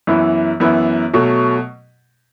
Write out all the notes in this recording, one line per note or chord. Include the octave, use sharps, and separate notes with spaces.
F#2 E3 B3 E4
F#2 E3 B3 E4
B2 F#3 A3